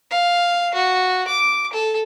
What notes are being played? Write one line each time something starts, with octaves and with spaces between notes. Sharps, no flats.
F5
F#4
D6
A4